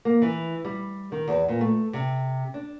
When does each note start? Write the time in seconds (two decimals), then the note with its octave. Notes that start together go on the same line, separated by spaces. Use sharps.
0.05 A#3
0.22 E3
0.65 G3
1.12 D#3
1.28 E2
1.49 A#2
1.61 A3
1.93 C3
2.54 D4